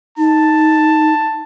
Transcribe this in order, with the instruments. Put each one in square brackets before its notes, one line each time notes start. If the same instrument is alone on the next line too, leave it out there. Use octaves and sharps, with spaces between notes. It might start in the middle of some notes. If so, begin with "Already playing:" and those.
[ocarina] D#4 [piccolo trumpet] A5